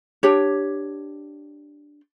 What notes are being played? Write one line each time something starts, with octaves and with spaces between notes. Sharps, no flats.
D4 G4 C#5